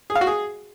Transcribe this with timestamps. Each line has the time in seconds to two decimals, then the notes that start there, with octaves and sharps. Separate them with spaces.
0.10 G#4
0.15 F5
0.21 F#4
0.27 G#4